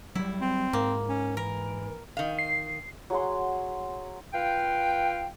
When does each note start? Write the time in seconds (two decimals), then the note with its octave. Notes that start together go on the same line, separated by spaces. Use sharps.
0.15 F#3 G3 E4
0.41 C4
0.73 G#2 A#3
1.09 C#4
1.37 E3 A#4
2.17 D#3 F5
2.39 C7
3.10 F#3 G#4 F#5 C6
4.33 F4 B4 F5 G5